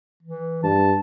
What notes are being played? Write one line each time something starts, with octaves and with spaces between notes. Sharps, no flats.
E3
G2 A5